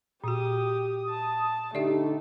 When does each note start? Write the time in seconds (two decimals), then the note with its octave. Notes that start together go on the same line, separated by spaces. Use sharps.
0.24 A#2 F#4 G4 D#6
1.10 A5
1.75 D3 A3 D#4 G4 D5 E5